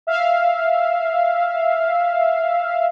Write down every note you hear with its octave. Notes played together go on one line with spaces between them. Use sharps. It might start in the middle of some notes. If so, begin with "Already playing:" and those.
E5 F5